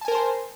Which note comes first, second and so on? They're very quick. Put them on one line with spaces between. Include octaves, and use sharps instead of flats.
A5 G#5 A#4 C5 C6